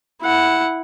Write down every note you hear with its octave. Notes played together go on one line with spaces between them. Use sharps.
E4 F#5